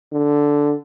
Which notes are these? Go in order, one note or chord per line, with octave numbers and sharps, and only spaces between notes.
D3